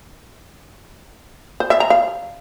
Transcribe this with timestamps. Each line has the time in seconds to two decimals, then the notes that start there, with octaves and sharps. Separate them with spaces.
1.60 C5
1.70 E5
1.80 A#5
1.90 F5